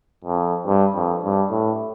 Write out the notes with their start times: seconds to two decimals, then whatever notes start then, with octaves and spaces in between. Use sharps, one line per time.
0.24 F2
0.67 G2
0.95 F2
1.23 G2
1.50 A2